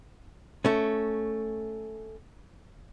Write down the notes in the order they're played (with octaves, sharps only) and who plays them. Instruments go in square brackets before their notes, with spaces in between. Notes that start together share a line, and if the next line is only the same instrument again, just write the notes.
[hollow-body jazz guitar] A3 C#4